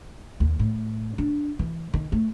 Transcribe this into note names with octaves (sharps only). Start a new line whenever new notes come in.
D#2
A2
D4
E3
D#3
A3